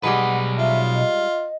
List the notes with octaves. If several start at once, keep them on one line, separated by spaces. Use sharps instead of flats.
B1 G3 G#3 D#4 B4 F#5
F4 E5
D#5